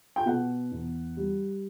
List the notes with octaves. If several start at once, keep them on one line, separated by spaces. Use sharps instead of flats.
G5
B2 F#5
E2
G3